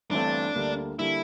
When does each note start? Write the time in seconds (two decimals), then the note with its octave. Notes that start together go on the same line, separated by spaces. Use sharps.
0.11 G1 G2 E3 A3 C4 D4
0.55 D2 D3 G3 A#3
0.99 D3 G3 A#3 E4